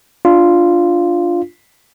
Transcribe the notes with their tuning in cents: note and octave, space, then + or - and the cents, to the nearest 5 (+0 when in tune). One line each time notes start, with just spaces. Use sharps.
D4 +0 F4 -5